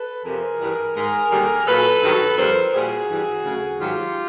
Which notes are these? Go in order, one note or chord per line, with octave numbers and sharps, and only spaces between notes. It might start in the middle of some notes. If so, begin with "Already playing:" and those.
Already playing: A4 B4
F2 C3 F3 G#4 A#4
G2 E3 G3
G#2 D#3 G#3 G#4 A#4
D#2 D3 G3
A#2 F#3 A4 B4
G2 D#3 F#3
F2 D3 G3 A#4 C5
A#2 G3 F#4 G#4
G2 E3 G3
D2 C#3 F#3
G#2 D#3 F#3 F4 G4